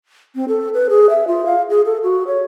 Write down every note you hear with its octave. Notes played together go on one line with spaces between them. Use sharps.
C4
A4
B4
G#4
E5
F4
F5
G#4
A4
F#4
C#5